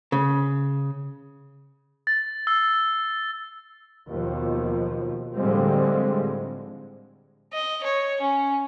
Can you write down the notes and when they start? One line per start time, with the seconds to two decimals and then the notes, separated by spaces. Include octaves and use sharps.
0.12 C#3
2.07 A6
2.47 E6
4.09 D#2 B2 F3
5.35 A2 D3 F3 G3 G#3 C4
7.53 D#5
7.83 C#5
8.21 C#4